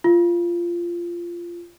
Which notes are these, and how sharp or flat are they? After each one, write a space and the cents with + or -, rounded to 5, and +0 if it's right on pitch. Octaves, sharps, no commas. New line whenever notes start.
F4 -15